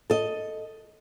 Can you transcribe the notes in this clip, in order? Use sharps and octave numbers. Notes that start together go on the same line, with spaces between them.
A4 D#5